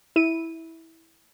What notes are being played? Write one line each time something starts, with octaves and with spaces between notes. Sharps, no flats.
E4 D#7